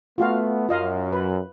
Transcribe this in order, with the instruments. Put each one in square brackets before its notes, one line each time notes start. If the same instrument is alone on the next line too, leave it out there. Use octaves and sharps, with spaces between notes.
[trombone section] A3 B3 [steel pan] F4 F#4 F5
[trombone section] F#2 [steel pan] F4 D#5 F5
[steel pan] B4